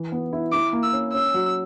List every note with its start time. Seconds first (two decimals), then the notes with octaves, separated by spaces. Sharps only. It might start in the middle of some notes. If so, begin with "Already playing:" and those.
Already playing: E3
0.12 B3
0.33 E4
0.52 E4 D6
0.73 A#3
0.83 E6
0.93 C#4
1.13 C#4 E6
1.34 F#3